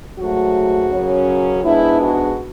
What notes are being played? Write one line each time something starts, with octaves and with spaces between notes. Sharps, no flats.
G#2 F#3 A3 F#4
F#2 C#3 F#3 C#4
G#2 G#3 B3 D4 E4
F#4